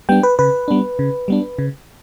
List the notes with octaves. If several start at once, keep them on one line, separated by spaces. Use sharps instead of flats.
G3 B3 D4 G5
B4
C#3 B4
G3 B3 D4
C#3
G3 B3 D4
C#3